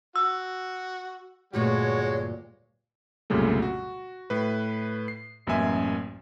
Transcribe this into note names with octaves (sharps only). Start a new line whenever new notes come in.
F#4 E6
D2 G2 A#2 G#3 F#4 C#5
C2 F#2 A#2 C#3 G3 A3
F#4
A2 B4
C7
A1 F#2 A#3 B3 E5 G#5